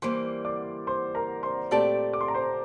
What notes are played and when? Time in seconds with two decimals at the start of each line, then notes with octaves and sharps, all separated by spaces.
0.02 E3 G3 A#3 C5 C6
0.45 D5 D6
0.87 C5 C6
1.15 A#4 A#5
1.43 C5 C6
1.71 A#2 A3 C4 G4 A4 D5 A5
2.13 D6
2.21 C6
2.28 A#5
2.34 C5 C6